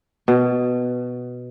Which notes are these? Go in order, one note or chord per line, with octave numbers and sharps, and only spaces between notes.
B2